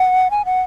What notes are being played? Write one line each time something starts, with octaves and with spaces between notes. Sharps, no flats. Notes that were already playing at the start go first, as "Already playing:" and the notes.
Already playing: F#5
G#5
F#5